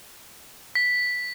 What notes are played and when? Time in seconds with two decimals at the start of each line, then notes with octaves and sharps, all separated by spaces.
0.75 B6